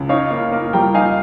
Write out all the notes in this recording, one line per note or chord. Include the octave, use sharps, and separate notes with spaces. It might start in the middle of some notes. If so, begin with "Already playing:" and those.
Already playing: C#2
D#4 C#5 F5
A#3
A#3
G3 G5 A#5
D#4 F5 G#5